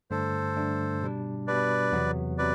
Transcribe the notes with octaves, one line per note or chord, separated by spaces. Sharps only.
G2 D3 A3 D4 A4 C5
G2 D3 A3 D4
B2 G3 D4
B2 G3 D4 B4 D5
E2 C3 F#3 B3
C3 F#3 B4 D5